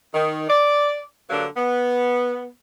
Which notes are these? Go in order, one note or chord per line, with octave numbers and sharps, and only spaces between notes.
D#3
D5
G2 D3 F#3 A#3 D4
B3